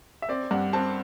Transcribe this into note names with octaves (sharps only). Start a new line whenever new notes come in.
E5
C4 D5
G2 F#5
C4 A5